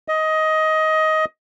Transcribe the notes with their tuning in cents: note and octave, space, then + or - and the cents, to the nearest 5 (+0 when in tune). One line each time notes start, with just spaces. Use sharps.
D#5 +15